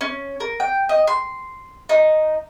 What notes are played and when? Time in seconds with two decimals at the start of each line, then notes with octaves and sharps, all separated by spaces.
0.01 C#4
0.40 A#4
0.60 G5
0.89 D#5
1.07 C6
1.89 D#4